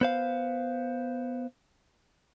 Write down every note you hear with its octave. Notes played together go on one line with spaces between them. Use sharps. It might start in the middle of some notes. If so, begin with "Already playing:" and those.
B3 C5 F5